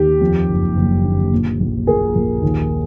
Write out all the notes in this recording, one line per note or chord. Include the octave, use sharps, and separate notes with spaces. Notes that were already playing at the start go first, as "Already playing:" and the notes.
Already playing: D#2 G4
F2
F#1
F#1
D3
A#2
A#1
A#2 G#4 A#4
A#1
D#2